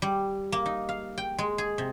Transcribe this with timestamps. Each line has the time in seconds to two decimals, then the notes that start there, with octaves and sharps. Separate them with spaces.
0.02 G3
0.52 A#3
0.66 D#4
0.89 F5
1.18 G5
1.38 G#3
1.58 G#4
1.78 C3